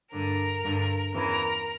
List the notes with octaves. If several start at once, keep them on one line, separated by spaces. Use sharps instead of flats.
G2 D3 A#4
G2 D3
E2 C#3 E3 A#4